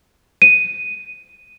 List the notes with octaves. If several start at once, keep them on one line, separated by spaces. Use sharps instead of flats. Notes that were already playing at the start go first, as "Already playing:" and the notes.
D#7